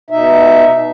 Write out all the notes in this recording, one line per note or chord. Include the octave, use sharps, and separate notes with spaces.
B2 D#4 E5